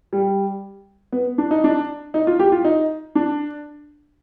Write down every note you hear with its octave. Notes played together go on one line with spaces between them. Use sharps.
G3
B3
D4
D#4
D4
D#4
F4
G4
F4
D#4
D4